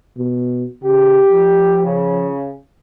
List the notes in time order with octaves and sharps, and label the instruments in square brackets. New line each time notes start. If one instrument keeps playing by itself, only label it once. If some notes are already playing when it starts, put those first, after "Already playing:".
[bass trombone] B2
[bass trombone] C#3 [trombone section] G4
[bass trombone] F3
[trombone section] C#3